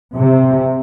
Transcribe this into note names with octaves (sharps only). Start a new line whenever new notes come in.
C3